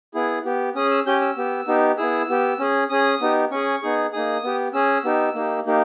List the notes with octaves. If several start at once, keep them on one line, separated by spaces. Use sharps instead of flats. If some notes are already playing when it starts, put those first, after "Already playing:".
B3 E4 G#4
B3 G4
C#4 G#4 D#6
E6
C#4 G4 G6
E6
B3 G4
B3 D#4 G4
B3 E4 G#4 E6
B3 G4
C#4 G#4
C#4 G#4 D#6
B3 D#4 G4
C#4 G#4 C#6
B3 D#4 G#4
A#3 D#4 G#4 D#6
B3 G4
C#4 G#4 E6
B3 D#4 G4
A#3 D#4 G4
A#3 D#4 G4